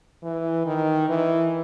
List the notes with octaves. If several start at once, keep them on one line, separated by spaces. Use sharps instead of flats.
E3
D#3
E3